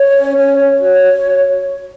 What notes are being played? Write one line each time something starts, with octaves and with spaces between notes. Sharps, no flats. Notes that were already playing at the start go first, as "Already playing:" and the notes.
Already playing: C#5
C#4
C#4 C#5
C#5
F#4 C#5